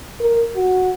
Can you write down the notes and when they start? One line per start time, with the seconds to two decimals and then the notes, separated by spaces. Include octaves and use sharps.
0.20 A#4
0.56 F#4